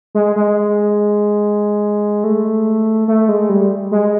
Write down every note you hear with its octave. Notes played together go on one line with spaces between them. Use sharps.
G#3
G#3
A3
A3
G#3
G3
G#3